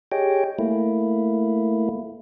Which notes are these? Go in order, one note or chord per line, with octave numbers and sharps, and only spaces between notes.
G4 G#4 C#5 D#5 G5
A3 A#3 E4